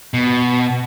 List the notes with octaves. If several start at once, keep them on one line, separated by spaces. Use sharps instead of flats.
B2